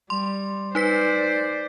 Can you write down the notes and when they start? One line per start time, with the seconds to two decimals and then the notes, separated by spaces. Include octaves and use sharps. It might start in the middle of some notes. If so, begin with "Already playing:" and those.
0.10 G3 C6
0.75 D#4 B4 C5 D5 B6